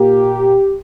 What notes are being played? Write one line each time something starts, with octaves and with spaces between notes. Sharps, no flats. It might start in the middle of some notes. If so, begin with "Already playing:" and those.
Already playing: A#2 A#3 G4